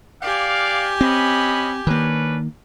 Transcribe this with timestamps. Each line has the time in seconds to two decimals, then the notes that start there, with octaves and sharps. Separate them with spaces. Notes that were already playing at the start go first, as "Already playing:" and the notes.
0.21 G4 D5 F5 G#5
1.01 C4 C#4 D#5 B5
1.87 D#3 A#3 C#4 D4 B4